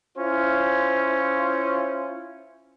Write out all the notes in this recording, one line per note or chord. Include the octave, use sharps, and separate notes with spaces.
C#4 E4 F4 C5